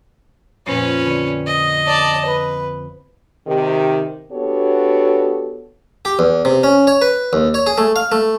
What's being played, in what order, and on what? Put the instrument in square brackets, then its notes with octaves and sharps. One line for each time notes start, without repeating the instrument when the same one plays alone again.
[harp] F2 A#2 [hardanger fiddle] C#4 B4
[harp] D3
[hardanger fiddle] D#5
[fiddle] D5 A5
B4
[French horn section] C3 D#3 G4
B3 D4 F#4 G4 A4 C#5
[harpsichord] G4
E2
C3
C#4
C#5
B4
D#2
C#5
G#4
A3
F5
A3